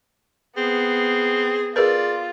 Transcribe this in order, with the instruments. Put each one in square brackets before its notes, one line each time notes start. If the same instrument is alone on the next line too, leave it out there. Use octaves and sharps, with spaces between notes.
[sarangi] B3 [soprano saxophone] C4 [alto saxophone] G#4
[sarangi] F4 [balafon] G#4 A#4 B4 [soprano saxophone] D5